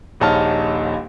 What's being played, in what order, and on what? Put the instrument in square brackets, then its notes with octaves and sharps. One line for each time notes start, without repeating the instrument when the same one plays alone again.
[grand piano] D#1 A#1 D#4 C#5 A5 F6